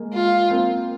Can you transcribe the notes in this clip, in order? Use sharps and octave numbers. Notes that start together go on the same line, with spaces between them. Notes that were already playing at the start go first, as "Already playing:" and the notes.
Already playing: G#3 A#3
F4
A#3 C4